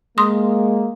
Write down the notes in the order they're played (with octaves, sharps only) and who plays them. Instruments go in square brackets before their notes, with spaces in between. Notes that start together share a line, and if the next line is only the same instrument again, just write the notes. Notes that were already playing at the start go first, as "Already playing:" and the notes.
[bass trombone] G#3 [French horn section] A#3 [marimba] C6 D#6